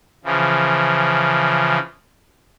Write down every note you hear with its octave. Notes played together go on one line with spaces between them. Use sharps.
C#3 E3 F3